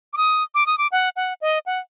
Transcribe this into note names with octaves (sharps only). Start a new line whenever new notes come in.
D6
D#6
D6
D#6
D6
F#5
F#5
D#5
F#5